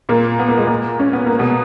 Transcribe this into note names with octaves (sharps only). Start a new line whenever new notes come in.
A#2 A#3
B3
A#3
G#3
A#2 A#3
C#4
B3
A#3
B2 B3